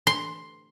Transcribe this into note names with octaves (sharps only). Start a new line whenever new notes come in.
C6